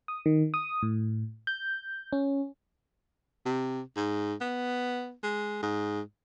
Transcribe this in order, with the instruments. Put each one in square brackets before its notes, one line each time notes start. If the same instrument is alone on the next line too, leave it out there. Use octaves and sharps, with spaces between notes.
[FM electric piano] D#6
D#3
D#6
A2
G6
C#4
[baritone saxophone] C3
G#2
B3
G#3
G#2